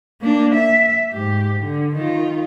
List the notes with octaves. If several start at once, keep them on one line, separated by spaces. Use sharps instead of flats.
A#3 D4
E5
G#2 G4
D3
D#3 F4